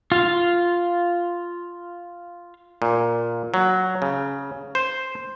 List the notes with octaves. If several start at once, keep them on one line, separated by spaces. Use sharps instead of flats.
F4 F5
A#2
F#3
C#3
C5